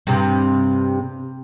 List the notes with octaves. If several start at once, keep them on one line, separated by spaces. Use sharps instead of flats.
G2 C3